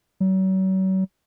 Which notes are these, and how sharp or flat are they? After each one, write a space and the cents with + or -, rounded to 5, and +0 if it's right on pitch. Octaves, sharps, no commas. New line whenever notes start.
F#3 +40